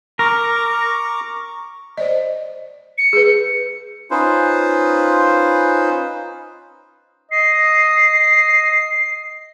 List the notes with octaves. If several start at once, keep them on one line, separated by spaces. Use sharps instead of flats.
A#4 A#5 C#6 D6
C5 D5 D#5
C#7
G#4 B4
C#4 D#4 F4 B4 C5
D#5 C7